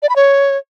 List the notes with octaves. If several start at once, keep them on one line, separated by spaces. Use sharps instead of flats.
D5
B5
C#5